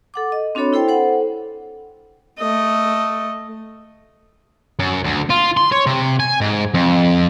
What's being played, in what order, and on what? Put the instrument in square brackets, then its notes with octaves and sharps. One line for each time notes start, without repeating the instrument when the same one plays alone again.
[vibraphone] A4 F#5 D6
D#5
C4 D4 F#4 A4 C#5 B5
E4 A4 C5 G5
A4 C5 F#5
[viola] A3 D#5
[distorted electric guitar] F#2
D2
F4
C6
C#5
C3
G#5
G#2
F2